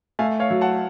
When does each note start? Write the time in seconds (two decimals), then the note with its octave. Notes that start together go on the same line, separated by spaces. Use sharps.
0.19 A3 F5 G#5
0.40 C#5 F5
0.50 F#3
0.61 F#5 A5